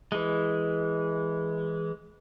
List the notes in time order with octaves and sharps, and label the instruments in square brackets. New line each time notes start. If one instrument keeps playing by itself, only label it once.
[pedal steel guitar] E3 G#3